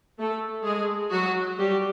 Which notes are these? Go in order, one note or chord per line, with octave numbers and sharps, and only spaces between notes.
A3 A4
G#3 G#4
F#3 F#4
G3 G4